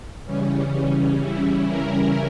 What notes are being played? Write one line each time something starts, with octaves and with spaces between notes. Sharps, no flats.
C#3 E3 G3 C#4
E4
A#4